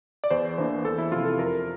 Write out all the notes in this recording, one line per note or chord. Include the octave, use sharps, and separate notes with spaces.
D5
E2 C5
E3 A#3 D4 C5
E2 A4
E4
C3 F3 F4
A4
F2 A#4